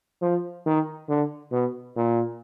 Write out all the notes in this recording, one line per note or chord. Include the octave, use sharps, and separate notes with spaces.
F3
D#3
D3
B2
A#2